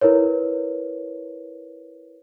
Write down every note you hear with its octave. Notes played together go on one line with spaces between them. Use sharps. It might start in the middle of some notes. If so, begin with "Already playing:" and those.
E4 A#4 B4 C#5